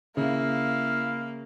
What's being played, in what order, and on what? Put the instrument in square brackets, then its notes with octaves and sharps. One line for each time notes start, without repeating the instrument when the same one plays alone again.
[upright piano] C#3 [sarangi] A#3 [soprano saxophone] E4 [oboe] F5